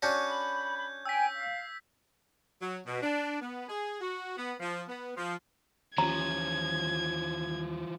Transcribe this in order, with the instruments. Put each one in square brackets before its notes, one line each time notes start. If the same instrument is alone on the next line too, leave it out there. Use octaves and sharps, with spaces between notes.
[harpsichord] C#4 D4 F#4 [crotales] G6 G#6
[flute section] B5
[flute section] G5 G#5 [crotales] E6 B6
[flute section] F5
[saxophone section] F#3
B2
D4
B3
G#4
F#4
B3
F3
B3
F3
[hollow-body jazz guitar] D#2 C#4 [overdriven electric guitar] E3 F3 [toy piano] A#5 [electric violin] G#6